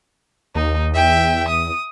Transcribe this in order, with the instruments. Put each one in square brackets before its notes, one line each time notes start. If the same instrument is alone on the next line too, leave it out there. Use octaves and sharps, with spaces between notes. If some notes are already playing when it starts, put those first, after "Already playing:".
[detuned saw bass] D#2 [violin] D#4
[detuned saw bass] E2 [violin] E5 G5
[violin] D#6